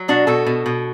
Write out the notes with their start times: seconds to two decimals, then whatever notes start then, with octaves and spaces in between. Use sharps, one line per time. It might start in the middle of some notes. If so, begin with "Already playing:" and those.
Already playing: F#3
0.08 B2 D4 F#4
0.27 B2 F#4 A4
0.46 B2
0.66 B2